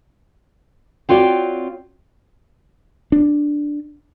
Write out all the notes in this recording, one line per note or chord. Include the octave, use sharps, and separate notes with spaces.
C4 F4 F#4 C#5 D5
D4